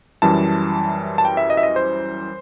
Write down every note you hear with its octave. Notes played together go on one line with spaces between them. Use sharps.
F#2 E3 G3 A5
A5
G5
E5
D#5
E5
D#5
C5